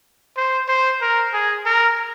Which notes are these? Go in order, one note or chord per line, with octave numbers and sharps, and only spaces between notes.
C5
C5
A#4
G#4
A#4